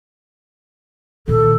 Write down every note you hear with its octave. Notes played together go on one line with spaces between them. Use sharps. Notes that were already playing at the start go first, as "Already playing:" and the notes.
A#2 D#3 A4